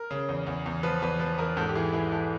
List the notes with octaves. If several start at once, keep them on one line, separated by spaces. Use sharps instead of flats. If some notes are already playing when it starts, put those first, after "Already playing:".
Already playing: A#4
C#3
E2
E2
E2
F3 B4
E2 B4
F3 B4
E2 A#4
G#2 A4
G4
E3 G#4
E3 G#4
E3 A4